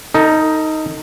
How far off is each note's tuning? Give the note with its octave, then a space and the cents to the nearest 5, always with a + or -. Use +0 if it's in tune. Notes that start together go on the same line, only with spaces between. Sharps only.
D#4 +10 A4 +40